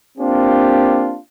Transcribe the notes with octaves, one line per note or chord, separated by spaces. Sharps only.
A#3 C4 D4 F4 G4